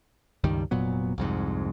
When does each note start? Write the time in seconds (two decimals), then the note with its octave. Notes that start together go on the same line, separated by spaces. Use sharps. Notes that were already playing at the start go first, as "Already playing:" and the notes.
0.44 C#2 G2 D#3 G3
0.71 F1 A#2 F#3 B3
1.18 C2 F2 G#2